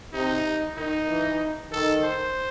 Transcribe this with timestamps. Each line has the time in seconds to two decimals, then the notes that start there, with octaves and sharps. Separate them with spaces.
0.13 C3 D#4
0.77 D#3 D#4
1.08 E3
1.72 D#3 A4
2.03 C5